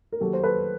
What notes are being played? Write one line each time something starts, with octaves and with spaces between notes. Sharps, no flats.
A#4
D#3 F#3 A#3 G4 A4
C5
A4 B4